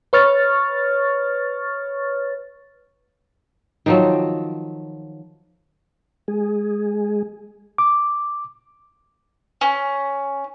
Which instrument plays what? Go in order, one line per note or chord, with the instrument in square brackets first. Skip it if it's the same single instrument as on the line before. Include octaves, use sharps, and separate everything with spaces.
[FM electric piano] B4 C#5 C#6 F6 A6
[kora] D#3 F3 F#3
[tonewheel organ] G#3 G#4
[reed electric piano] D6
[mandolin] C#4